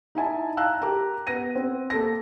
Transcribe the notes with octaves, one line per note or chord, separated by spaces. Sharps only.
D#4 E4 G#5 A5
F5 G5 A5 A#5 E6 F#6
G4 A#4 A#5
B3 A#6 D#7
C4
A#3 A4 A#6